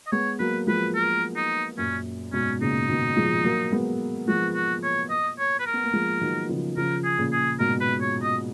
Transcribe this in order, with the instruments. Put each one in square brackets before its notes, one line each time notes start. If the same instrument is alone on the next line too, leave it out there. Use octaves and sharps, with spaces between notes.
[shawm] D#5
[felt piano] G#3 B3 [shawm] C#5
[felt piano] F#3 A#3 [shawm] B4
[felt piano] F3 G#3 [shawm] B4
[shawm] A#4
D#4
[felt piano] F#2 A#2 [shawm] C#4
[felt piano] G#2 B2 [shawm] C#4
[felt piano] A#2 C#3 [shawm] D#4
[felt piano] B2 D#3
F3 G#3
F#3 A#3
G#3 B3
[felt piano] F3 G#3 [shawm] F#4
[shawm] F#4
C#5
D#5
C#5
B4
A#4
[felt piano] B3
A#3
F3 G#3
D#3 F#3
C#3 F3
[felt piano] C#3 F3 [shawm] A#4
[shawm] G#4
[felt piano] A#2 C#3
[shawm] G#4
[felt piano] G#2 B2 [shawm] A#4
[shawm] B4
C#5
D#5